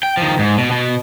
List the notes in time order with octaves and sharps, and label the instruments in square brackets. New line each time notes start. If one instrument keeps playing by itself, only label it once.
[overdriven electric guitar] G5
D#3 F3
G#2
B2
B2